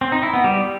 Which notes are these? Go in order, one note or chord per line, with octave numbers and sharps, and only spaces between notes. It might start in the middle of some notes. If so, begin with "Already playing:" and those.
C4
D#4
E4
B3
G3